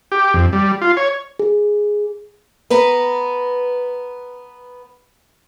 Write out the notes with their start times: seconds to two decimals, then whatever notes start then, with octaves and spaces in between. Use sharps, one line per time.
0.12 G4
0.34 F2
0.53 G3
0.81 F4
0.97 C#5
1.39 G#4
2.70 B3 B4 A#5